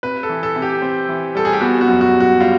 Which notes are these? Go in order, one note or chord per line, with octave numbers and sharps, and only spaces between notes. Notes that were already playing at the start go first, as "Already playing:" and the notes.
C3 B4
A4
E3
A4
C3
G4
C4
E3
G3 A4
G#4
G4
B3 F#4
F#4
F#2
F#4
G3
F#4
G3 F4